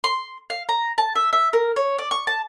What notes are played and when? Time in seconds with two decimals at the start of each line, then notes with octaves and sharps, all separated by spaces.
0.04 C6
0.50 F5
0.69 A#5
0.98 A5
1.15 E5
1.33 E5
1.53 A#4
1.76 C#5
1.99 D5
2.11 C#6
2.27 A5